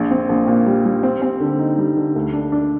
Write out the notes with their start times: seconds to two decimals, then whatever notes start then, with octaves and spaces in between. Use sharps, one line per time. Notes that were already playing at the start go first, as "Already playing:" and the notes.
Already playing: A#1
0.11 C4
0.29 A#1
0.47 A#2
0.66 G3
0.85 G3
1.03 C4
1.22 C4
1.40 D3
1.59 D#4
1.78 G3
1.97 D3
2.16 D2
2.33 D4
2.52 D4